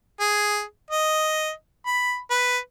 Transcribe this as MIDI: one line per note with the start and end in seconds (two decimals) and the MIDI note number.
0.20 0.63 68
0.91 1.51 75
1.86 2.17 83
2.30 2.58 71